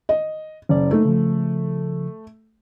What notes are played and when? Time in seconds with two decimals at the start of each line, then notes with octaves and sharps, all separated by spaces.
0.09 D#5
0.69 F#1 C#4 D5
0.91 A3 A#3 D#4
1.05 C#3 F3